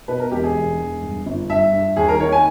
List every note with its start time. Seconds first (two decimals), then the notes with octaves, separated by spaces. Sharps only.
0.08 B2 B4
0.20 A#4
0.31 E1 G4
0.43 G#4
0.55 E1
0.79 E1
1.02 G2
1.26 G1
1.49 G2 E5
1.73 G2
1.96 D#2 G#4
2.08 A#4
2.20 D#3 C#5
2.32 G#5